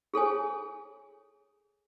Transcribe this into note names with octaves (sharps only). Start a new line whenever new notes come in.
G#4 A4 C#5 G#5